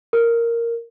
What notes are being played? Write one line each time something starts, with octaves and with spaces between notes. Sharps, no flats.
A#4